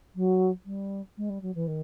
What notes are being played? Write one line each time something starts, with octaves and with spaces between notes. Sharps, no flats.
F#3
G3
G#3
G3
F#3
E3
D#3